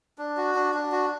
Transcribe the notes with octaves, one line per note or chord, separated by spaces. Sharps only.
D4
F#4
D4
D4
F#4